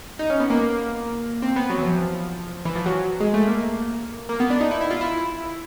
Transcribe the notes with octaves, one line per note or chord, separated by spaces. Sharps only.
D#4
C#4
B3
A#3
C4
B3
F#3
E3
F3
E3
F3
F#3
F#3
G#3
A3
A#3
A#3
B3
D4
D#4
E4
E4
F4
E4